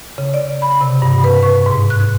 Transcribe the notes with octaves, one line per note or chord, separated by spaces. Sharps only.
C#3
D5
B5
C3
G2
B4
C#6
G#2
F#6